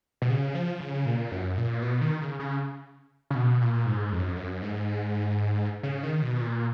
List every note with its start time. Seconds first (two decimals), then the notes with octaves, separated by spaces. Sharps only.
0.22 B2
0.30 C#3
0.55 F3
0.80 C#3
1.06 A#2
1.32 F#2
1.57 A#2
1.82 B2
2.01 D#3
2.21 C#3
2.39 C#3
3.30 C#3
3.35 B2
3.61 A#2
3.86 G#2
4.12 F2
4.19 F#2
4.27 F2
4.37 F#2
4.62 G#2
5.83 C#3
6.03 D#3
6.22 B2
6.41 A#2